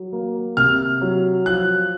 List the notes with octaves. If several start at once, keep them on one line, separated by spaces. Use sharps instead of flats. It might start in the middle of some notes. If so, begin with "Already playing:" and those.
Already playing: F#3
A#3
C3 F6
F#3
F3 F#6